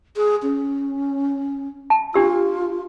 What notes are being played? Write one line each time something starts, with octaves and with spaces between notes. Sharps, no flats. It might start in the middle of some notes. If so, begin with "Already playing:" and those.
G#4
C#4
A5
D4 F4 G4 E6